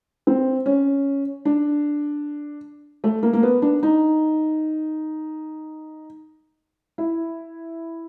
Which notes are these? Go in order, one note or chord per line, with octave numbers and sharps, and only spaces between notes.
C4
C#4
D4
A3
A#3
A#3
B3
D4
D#4
E4